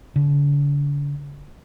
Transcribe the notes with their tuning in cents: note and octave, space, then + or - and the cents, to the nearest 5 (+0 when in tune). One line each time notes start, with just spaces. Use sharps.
D3 -40